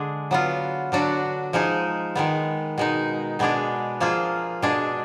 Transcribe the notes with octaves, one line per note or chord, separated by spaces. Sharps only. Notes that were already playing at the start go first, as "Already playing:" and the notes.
Already playing: D3 G#3 D4 G#4
F#3 B3 F4
D3 F#3 D4 F#4
F3 G#3 D#4 G#4
D#3 G#3 B3
B2 G#3 D#4
B2 G#3 B3 D4 G#4
F3 A#3 F4 G#4
B2 G#3 D4 G#4